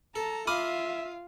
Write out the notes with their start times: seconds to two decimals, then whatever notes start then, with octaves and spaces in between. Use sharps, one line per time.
0.16 A4 A5 A#5
0.47 F4 E5 F5 B5 D6 D#6 F6